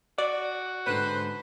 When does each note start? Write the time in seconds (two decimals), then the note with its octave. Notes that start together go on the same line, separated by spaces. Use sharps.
0.18 F#4 D5
0.87 G#2 D3 C4 B4 C5